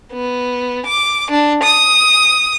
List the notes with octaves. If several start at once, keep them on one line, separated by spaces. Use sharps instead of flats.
B3
D6
D4
D#6